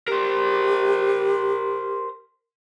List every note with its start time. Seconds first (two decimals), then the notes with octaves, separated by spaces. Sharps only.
0.08 G4 A#4 C5